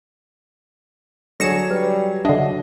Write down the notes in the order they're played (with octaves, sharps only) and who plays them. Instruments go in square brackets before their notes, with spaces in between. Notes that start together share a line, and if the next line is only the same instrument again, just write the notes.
[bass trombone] D3 [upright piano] F#3 G#4 C#5 [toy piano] A4 [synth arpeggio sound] A#6 C#7 E7
[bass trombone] G3 [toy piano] B4
[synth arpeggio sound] D3 D4 [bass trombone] F#3 [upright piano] D#5 [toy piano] E5 F#5